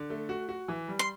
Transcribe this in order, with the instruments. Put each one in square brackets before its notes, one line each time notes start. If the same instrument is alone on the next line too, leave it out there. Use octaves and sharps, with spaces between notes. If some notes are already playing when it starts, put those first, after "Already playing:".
Already playing: [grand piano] D3
A3
F#4
F#4
E3
G3
[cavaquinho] C6